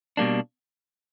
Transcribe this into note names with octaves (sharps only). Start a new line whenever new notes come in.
B2 G3 A#3 D4